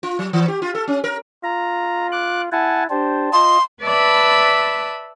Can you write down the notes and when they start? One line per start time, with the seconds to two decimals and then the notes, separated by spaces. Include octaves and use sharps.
0.03 F4
0.19 F#3
0.33 E3
0.48 G4
0.62 F4
0.75 A4
0.88 C#4
1.04 A#4
1.44 F4 A#5
2.12 D6 F#6
2.52 E4 F#5 G#5 A5
2.90 D4 G4 C5 A5
3.33 F4 D#5 C6
3.83 B4 D5 E5 A5 B5